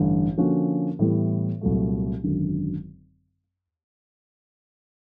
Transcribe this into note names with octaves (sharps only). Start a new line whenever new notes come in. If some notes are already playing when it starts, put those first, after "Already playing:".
Already playing: A1 G2 D3
D3 F3 A#3 C#4 F#4
A2 E3 G3 B3
C2 A#2 F#3 A3
G#1 F#2 D3